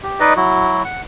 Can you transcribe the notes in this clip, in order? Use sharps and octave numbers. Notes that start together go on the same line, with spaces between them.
G4
D#4 B4 D5 D#5
F#3 E4 F#4
F#5